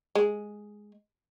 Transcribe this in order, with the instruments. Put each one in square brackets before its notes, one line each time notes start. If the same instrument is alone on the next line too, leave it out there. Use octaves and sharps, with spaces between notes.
[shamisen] G#3